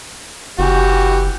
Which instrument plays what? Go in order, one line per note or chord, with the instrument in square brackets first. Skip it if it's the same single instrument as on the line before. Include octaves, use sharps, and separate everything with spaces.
[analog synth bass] F#1 [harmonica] E3 F#4 G4